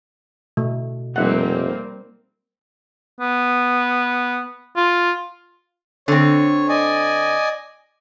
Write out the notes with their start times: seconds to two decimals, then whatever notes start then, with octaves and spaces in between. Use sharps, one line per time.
0.57 B2 A3
1.16 F1 G3 A#3 C4 D#4 E5 F#5
3.20 B3
4.77 F4
6.08 D3 C4 C#5
6.69 D5 D#5 G#5